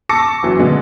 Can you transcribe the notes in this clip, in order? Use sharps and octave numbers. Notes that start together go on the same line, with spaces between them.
A5 C#6 D6 E6 A#6 C#7
F#1 E3 F#3
B2 D3 G#3 A3 B3